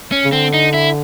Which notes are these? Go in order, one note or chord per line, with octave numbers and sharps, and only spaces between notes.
C#4
C#3
D3 C4
D#4
E4